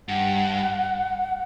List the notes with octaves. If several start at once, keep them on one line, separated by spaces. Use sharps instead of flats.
G2 F#5